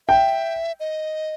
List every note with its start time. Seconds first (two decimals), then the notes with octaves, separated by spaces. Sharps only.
0.08 E5 G5
0.80 D#5